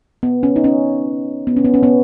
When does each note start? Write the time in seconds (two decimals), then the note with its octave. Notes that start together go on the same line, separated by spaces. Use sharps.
0.23 B3
0.43 C#4
0.56 D#4
0.64 C#4
1.47 B3
1.57 C#4
1.65 B3
1.74 C#4
1.83 B3